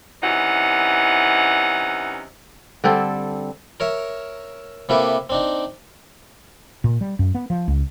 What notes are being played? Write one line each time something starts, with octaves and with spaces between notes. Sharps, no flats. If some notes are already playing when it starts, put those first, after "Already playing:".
C3 E3 C#4 D#4 E4 F#5
D3 G3 C4 A4
A#4 C#5 E5
C3 A#3 E4 G4 A4 B4
C4 D4 D#4
A#2
G3
F#2
B3
F3
C#2